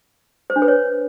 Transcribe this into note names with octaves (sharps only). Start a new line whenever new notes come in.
C5
D4
B4
C#5